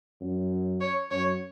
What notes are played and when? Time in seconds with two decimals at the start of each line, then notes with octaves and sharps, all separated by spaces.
0.21 F#2
0.81 C#5
1.11 F#2 C#5